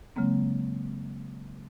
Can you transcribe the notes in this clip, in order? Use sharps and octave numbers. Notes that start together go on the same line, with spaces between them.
C#3 F#3 G#3 A#3 C4